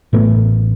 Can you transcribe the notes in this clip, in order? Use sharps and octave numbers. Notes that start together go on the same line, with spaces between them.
A1 A2 A3 B3